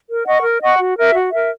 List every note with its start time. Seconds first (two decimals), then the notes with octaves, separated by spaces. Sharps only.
0.09 A#4
0.26 D#5 F#5 C#6
0.43 A#4
0.61 D#5 F#5 C#6
0.79 F#4
0.97 A#4 E5
1.15 F#4
1.32 A#4 E5